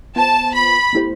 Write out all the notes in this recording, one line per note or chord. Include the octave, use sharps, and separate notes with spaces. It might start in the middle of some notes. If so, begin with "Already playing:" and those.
B3 F4 C5 A5
B5
B2 A3 E4 G4 C5